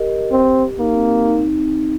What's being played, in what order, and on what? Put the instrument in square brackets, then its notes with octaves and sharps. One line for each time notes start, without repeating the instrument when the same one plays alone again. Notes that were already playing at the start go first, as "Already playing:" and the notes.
Already playing: [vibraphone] G4 A#4 D#5
[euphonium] C4
[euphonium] A#3 [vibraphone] D#4
[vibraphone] C4
C4
D#4
C4
C4